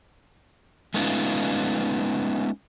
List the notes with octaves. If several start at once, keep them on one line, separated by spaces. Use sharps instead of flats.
G#3 A3 B3 C#4 D#4 F4